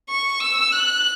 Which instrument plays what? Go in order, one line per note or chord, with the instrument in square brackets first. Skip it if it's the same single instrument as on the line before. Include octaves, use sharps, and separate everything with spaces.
[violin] C#6
E6
F#6